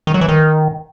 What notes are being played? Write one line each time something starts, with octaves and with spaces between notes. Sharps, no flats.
D#3
F#3
E3
D#3